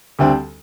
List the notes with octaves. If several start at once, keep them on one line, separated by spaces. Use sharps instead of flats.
D2 D3 G3 C4